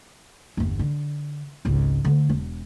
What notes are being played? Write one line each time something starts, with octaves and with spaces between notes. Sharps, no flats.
G1 E2
D3
G#1 C#2
D3 A3
E1